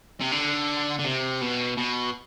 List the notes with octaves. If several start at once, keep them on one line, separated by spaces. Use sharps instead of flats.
C3
D3
D3
C3
B2
B2